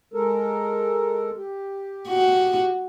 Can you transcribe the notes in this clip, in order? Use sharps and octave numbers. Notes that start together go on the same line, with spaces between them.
G#3 A4 A#4
G4
F#4